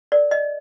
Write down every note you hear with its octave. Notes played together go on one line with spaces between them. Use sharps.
A#4 D5
D#5